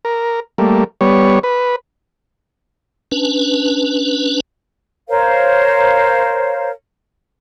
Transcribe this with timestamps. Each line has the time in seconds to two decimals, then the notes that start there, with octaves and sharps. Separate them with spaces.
0.05 A#4
0.58 G3 A3 A#3
1.01 G3 B3 C#5
1.43 B4
3.12 C#4 D4 B4
5.09 A#4 C5 C#5 F5